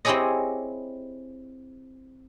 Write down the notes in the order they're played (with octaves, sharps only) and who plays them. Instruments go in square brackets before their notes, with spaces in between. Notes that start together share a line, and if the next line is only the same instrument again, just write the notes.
[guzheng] C4 E4 G4 G#4 C#5 D#5